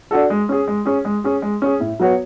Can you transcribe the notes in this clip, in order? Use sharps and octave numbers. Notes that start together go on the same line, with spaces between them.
D4 F#4 A4
G#3
C#4 G#4
G#3
C#4 G#4
G#3
C#4 G#4
G#3
C#4 G#4
A2
F#3 B3 F#4 C#5